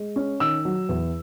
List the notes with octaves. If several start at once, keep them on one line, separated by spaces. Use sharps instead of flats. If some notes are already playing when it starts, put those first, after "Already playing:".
Already playing: G#3
C#4
D#3 E6
F#3
E2